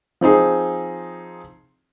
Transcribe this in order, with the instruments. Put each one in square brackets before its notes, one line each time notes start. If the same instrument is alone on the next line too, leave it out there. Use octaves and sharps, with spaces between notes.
[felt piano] F3 C4 D#4 G#4